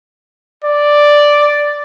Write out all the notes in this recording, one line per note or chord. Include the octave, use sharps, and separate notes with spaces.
D5